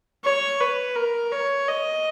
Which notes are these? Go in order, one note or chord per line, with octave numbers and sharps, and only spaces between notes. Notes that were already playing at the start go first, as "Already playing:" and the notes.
C#5
B4
A#4
C#5
D#5